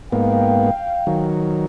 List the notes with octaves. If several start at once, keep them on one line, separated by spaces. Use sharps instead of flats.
G#2 A#3 B3 F5 G5
D#3 F#3